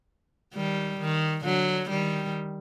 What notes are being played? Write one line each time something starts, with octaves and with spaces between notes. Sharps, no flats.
D#3 G3
D#3
D3 F#3
D#3 G3